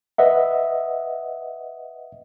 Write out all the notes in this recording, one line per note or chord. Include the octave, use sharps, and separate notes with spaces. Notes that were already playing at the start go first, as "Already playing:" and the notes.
B4 D#5 E5 F#5